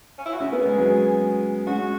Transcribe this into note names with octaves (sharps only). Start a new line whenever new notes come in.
C#4
E4
F#4
C#4 G#4
B3
G#3
F#3 B3
G#3 C#4 F#4